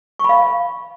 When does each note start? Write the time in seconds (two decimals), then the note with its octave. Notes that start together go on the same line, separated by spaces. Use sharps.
0.19 C#6
0.24 B5
0.29 F5